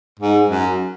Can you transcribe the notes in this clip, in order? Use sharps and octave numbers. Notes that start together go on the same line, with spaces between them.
G#2
F#2